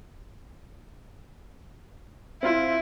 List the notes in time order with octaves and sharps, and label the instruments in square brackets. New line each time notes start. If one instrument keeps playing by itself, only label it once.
[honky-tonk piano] C4 F4 C5 [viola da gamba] E4